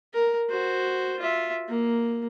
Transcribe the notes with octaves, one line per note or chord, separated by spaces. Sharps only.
A#4
F#4 C5
F4 E5
A#3